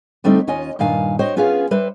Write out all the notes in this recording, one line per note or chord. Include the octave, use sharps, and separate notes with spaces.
D3 G3 A3 C4 D4 D#4
D#2 C#4 F4 D#5 G#5
G2 A#2 D#3 F5 G#5
F#4 C5 C#5 D#5 G5
B3 C#4 F4 G#4 B4 F5
G3 B4 C5 E5